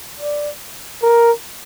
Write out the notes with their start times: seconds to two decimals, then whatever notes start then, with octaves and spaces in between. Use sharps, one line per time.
0.20 D5
1.03 A#4